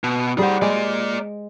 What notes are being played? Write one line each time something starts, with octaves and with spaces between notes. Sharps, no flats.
B2
G3 G#4 C5 F#5
G#3 A#3 D5